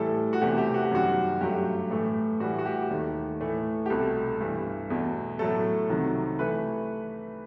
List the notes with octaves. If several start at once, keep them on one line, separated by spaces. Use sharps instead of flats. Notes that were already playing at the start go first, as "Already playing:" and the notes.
Already playing: A2 E3 G3 A4
F#4
E2 C3 E3 A3 G4
G4
F#4
G4
F#2 D#3 G3 F#4
G2 F#3 A3 G4
A2 E3 A3
A2 E3 G3 F#4
F#4
G4
D#2 D#3 A3
A2 E3 A3
G4
C2 B2 A3 A4
G2 E3 G3
E2 B2 A3
A2 F#3 A3 A4
C2 C3 D#3 F#3
E3 A3 B4